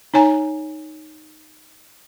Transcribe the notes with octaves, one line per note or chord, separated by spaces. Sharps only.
D#4 C#5 G#5 A#5